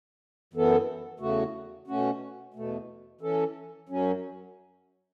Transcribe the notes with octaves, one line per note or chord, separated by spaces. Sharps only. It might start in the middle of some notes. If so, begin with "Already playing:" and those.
F#2 E3 B3 A4
E2 C#3 A3 F#4
B2 A3 C#4 F#4
E2 B2 A3
E3 C#4 A4
F#2 F#3 C#4